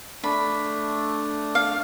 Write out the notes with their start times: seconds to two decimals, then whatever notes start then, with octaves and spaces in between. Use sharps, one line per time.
0.24 A3 D4 B5
1.55 F5